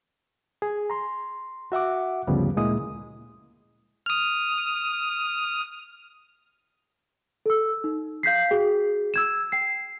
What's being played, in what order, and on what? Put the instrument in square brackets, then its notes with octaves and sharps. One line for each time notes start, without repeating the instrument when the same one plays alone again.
[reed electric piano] G#4
A#5 C6
F#4 E5 F#5 D6
D2 G2 C#3 F3 G3 B3
D2 A#2 G#3 A#3 E4 D#6
[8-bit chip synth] D#6 F6
[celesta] A4 E6
D#4
F5 G6 B6 C7
F#4 G#4 G5
E6 G#6 E7
G5 C7